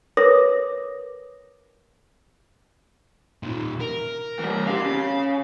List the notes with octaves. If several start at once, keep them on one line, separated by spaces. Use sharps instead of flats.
A#4 B4 C#5 D6 D#6 A#6
A#2 D#3
A#4
E3 G3
C4 G4 F5
C#3